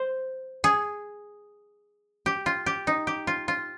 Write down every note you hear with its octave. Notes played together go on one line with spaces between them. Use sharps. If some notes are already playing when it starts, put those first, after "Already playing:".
Already playing: C5
G#4
G4
F4
G4
D#4
G4
F4
F4